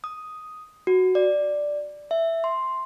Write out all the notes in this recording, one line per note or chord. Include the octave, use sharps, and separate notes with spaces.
D#6
F#4
D5
E5
C6